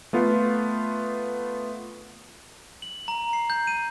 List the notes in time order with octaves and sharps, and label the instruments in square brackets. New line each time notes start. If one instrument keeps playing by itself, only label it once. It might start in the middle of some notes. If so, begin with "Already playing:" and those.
[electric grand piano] A3 B3 F4
[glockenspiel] F#7
A#5
C7
G6
D#7